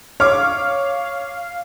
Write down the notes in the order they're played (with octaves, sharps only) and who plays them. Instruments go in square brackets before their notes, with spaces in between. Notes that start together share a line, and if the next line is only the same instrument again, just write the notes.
[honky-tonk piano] C#5 D6 [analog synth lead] F5 [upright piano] F6